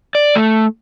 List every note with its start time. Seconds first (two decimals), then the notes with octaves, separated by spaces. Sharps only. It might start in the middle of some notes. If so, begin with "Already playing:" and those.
0.15 D5
0.35 A3